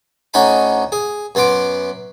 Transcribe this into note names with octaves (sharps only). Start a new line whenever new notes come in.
D2 C#4 D#4 F#5 G#5 B5
G#4
F#2 B3 F#5 C6 D6